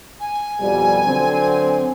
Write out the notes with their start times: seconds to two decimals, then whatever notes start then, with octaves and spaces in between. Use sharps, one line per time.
0.20 G#5
0.60 F2 B2 G3
1.04 D3 F#3 C4